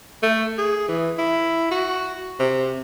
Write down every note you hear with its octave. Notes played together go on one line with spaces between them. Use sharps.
A3
G#4
E3
E4
F#4
C3